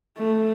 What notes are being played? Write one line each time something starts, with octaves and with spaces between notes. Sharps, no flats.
A3